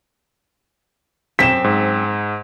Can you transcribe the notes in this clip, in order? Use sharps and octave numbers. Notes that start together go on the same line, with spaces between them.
F#2 C4 B6 E7
G#2